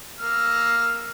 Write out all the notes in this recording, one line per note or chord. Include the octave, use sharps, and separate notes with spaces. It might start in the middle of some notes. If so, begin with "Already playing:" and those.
A#3 E6 F6